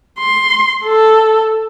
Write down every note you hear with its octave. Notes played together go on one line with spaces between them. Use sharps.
C6
A4